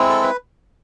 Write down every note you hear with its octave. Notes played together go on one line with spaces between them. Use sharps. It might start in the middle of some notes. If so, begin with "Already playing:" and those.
Already playing: G#3 C4 E4
A4
B4